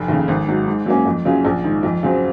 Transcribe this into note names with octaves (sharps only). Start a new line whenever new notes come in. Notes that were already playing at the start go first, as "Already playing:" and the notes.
Already playing: F1
D#2 C#3
G#1
G#2 F#3
G#2
F#3 A#3 C#4
F2
C#3 F#3 C#4 F4
A#1
G#2 D#3
F2
C#3 F#3 C4